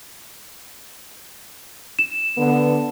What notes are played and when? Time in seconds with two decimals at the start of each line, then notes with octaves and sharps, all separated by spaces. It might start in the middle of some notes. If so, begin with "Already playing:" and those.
1.99 E7
2.37 D3 B3